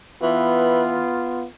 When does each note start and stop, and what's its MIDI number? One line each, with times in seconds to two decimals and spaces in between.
0.22 1.05 52
0.22 1.46 59
0.22 1.45 65